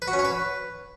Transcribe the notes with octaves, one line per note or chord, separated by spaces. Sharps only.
B4
F#4
C#4
C#5
B4